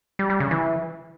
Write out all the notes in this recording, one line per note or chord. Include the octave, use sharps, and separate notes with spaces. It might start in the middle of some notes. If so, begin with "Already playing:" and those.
G3
G3
C#3
E3